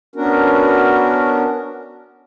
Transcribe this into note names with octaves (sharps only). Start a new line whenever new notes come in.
B3 C#4 D4 F#4 A#4